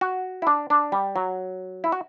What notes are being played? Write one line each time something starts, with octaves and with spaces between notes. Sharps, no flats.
F#4
E4
D4
D4
G3
F#3
E4
F#4